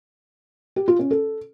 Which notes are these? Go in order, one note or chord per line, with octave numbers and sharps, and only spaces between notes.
G4
F4
C#4
A4